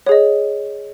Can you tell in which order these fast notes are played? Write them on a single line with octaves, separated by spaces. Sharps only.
C#5 G#4 D#5